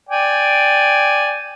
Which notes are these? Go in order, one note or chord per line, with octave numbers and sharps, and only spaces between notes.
D5 G5 G#5